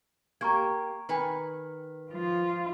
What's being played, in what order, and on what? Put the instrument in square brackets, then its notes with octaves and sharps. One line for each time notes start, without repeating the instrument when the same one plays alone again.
[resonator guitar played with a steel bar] A#3 G4 [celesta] A#5 C#6 G#6
[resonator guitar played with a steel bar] D#3 B4 G#5
[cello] F3 F4